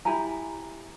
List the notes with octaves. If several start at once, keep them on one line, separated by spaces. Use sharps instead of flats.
E4 G4 G#5 A#5